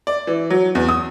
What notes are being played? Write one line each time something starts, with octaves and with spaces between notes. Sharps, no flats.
D5
E3
F#3
E2
D#6